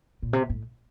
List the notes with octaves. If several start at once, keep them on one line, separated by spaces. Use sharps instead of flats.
A#2
C3
A2